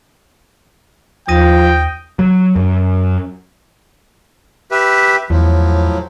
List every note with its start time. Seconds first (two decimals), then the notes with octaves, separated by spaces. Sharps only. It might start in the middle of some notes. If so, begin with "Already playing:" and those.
1.28 D#2 F3 G5 D#6 A#6 D#7
2.19 F#3
2.56 F#2
4.71 G4 B4 E5
5.30 E2 A2 F3 F#3